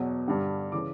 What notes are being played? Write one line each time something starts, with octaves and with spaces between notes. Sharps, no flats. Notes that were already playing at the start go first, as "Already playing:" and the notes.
Already playing: E2 B2 F#3
G2 D3 G3
C#3 E3 D6